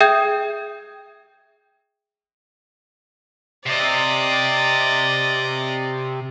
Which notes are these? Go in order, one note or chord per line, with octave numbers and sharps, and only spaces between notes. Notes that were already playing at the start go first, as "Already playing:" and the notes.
G#4 E5 G5 D#6 G6 G#6
C3 D5 D#5